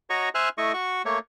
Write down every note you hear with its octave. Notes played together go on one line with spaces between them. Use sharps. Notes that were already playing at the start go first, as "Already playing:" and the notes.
F#4 C#5 D#5 A#5 C#6
C5 E5 G#5 F6 F#6
A3 E4 D#5 C#6
F#4 C#6
A3 A#3 C#5